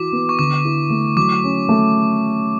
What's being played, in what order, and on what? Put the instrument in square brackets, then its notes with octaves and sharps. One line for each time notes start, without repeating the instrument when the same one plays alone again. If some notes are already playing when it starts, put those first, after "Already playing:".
Already playing: [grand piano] E3 F#4 [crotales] D6
[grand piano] B3
[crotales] C#6
[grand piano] D3 [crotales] D6
[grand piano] E4
A3
[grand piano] F#3 [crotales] D6
[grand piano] C#4
A3